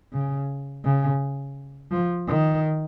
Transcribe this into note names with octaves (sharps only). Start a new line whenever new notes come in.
C#3
C#3
F3
D#3